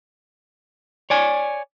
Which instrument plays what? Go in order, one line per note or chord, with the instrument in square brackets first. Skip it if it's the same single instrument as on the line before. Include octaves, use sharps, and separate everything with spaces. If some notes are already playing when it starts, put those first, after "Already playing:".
[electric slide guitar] C#5 D5 G#5